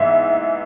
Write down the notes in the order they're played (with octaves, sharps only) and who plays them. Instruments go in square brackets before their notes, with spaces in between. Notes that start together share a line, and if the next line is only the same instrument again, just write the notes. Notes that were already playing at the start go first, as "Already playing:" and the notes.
Already playing: [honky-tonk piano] G#2 E3 B3 E5